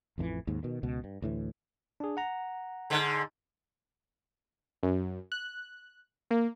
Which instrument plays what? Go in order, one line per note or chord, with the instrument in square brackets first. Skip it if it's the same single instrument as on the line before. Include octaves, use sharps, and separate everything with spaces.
[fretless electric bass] A1 F2 D3 E3
D#2 G#2
B2 D#3
C#2 B2
G2
D2 A2 E3
[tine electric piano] D4 G#4
F#5 A#5
[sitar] G#2 D3
[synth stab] F#2
F#6
A#3